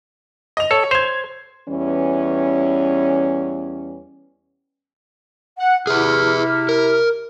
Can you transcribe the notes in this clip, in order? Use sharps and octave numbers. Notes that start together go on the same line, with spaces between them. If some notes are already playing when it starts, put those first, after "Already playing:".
D#5 F7
A4 C#5
C5 G#6 F7
E2 E3 G3 C#4
F#5
C3 E4 G#4 B4 F6
A#4